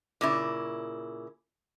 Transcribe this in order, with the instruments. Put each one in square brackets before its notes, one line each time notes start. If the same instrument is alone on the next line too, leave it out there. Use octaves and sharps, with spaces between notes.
[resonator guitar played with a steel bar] A#2 C#3 E4